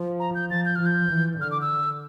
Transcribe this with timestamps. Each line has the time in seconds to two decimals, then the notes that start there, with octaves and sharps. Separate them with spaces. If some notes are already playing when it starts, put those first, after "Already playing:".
Already playing: F3
0.20 A#5
0.35 G6
0.49 F3 A6
0.65 G6
0.76 F3 F6
0.86 G6
1.11 E3
1.40 D3 F6
1.51 D6
1.61 E6